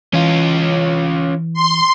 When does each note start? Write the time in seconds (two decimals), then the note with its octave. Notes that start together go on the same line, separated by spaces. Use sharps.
0.13 E3 C#4 F4
1.54 C6